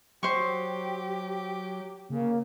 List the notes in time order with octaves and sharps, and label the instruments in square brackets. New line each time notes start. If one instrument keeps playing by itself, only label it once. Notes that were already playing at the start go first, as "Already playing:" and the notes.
[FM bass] F#3 [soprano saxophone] G4 [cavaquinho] C5 C#6
[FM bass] C#3 [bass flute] A#3